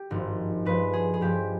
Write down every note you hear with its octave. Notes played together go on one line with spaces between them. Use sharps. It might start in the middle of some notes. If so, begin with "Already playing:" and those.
Already playing: G4
G#1 G2 F3
G2 F3 G#3 B4
G#4
G#4
G2 F3 G#3 G4